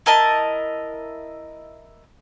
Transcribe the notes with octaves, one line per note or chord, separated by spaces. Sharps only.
E4 A#4 D#5 A5